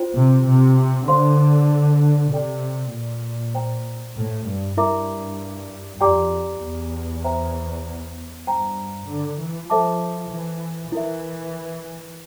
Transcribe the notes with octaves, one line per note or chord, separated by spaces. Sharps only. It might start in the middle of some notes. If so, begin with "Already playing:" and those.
Already playing: F4 C5 G5
C3
C3
D3 C5 F5 C6
C3 A4 D5 G5
A#2
C5 G5 A#5
A2
G2
G2 E4 A#4 E5 A#5 D6
F2 G4 D5 G5 A#5 D6
E2
C5 E5 G5 A#5
G2 C5 G5 A#5
D3
E3
F3 A4 C5 E5 A5 D6
E3
E3 E4 A#4 E5